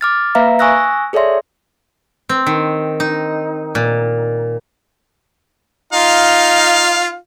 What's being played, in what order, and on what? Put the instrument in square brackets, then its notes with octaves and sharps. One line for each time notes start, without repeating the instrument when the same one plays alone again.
[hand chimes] D6 F6 A6
A#3 B4 E5 F5 A#5
G#5 C#6 D#6 E6 F#6 A#6
G#4 A4 C#5 D5 E5 C6
[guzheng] C4
D#3
D#4
A#2
[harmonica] D#4 F4 F5